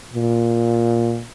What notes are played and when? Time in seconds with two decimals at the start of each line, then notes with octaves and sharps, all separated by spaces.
0.14 A#2